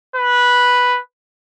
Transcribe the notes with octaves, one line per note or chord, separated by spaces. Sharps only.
B4